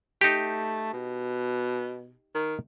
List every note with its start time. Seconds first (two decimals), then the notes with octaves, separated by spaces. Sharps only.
0.21 A3 D#4 G4
0.93 B2
2.34 D#3